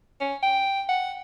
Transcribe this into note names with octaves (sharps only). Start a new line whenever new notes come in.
C#4
G5
F#5